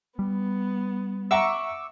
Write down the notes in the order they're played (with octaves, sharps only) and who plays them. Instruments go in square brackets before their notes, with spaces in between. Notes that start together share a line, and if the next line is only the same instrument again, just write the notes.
[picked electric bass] G3 [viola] B3
[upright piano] E5 F#5 A#5 [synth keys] C#6 D6 E6